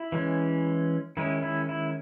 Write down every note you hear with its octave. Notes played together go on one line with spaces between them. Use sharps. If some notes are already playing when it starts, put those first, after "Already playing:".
Already playing: E4
E3 G#3 C#4
D#3 G#3 C#4 E4
E4
E4